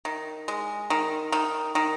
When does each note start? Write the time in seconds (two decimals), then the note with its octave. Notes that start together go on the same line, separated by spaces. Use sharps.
0.05 D#3
0.48 G#3
0.90 D#3
1.32 D#3
1.75 D#3